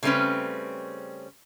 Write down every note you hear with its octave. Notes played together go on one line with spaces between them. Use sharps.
C#3 G3 A3 C4 C#4 B4